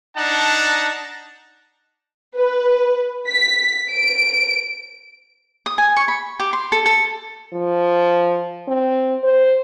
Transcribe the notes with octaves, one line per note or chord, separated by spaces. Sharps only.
D4 D#4 F#5 A5
B4
B6
D7
D#6
G#5
C#6
B5
G4
C6
A4
A4
F3
C4
C5